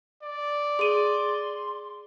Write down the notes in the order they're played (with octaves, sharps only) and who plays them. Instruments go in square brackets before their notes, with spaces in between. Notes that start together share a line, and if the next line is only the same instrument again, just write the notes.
[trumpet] D5
[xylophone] G#4 D#7 [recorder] C6